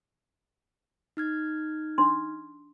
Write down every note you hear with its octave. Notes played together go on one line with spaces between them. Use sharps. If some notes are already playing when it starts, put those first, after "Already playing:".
D#4 F6 G#6
D4 C6